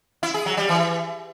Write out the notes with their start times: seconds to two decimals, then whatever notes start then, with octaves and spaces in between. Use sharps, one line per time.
0.23 E4
0.34 G#4
0.46 F#3
0.57 G3
0.69 E3